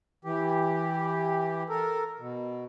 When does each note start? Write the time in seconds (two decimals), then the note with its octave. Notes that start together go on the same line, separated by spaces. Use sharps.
0.25 E3 G4
1.69 A4 A#4
2.19 B2